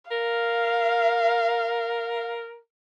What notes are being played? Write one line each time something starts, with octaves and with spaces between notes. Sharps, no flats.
A#4 F5